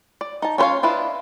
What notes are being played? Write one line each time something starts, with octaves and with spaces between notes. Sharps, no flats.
D5
D#4 A5
C#4 F4 B4 C#5 F5
D4 E4 F4 B4 D#5